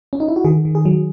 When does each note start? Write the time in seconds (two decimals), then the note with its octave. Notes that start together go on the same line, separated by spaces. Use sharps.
0.13 C#4
0.20 D#4
0.28 E4
0.36 F#4
0.45 D#3 G#4
0.65 D#3
0.75 G#4
0.85 F#3